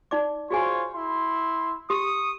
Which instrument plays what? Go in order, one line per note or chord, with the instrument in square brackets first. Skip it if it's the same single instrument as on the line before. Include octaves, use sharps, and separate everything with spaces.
[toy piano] D#4 D5 D6
[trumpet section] F4 C5 C#5 [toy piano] F#4 G#4 G#5
[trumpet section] E4 C6
[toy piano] G4 C6 [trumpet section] C#6 D#6